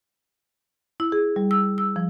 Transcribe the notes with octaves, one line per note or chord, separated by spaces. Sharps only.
E4
G#4
G3
E6
E6
F3